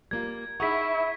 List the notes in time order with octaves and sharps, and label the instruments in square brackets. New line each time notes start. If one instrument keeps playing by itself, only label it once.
[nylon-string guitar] G3 A#3 F4 [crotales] G#6
[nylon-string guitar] D#4 G#4 F#5 [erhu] E4 [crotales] C#6 B6